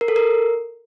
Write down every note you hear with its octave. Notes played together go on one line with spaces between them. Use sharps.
A#4
A4
A#4